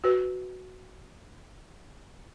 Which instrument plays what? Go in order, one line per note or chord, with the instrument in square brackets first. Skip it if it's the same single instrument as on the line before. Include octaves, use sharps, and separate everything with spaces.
[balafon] F#4 B4